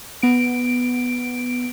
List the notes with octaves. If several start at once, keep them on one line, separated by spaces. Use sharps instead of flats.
B3 D7